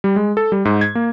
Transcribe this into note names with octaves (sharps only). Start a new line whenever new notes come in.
G3
G#3
A4
G3
G#2
G#6
A#3